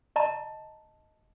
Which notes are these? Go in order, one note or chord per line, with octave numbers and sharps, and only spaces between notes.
D#5 A5 A#5